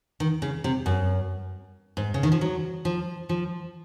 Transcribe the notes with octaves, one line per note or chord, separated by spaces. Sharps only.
D#3
C#3
C3
F#2
G#2
C#3
D#3
F3
F#3
F3
F3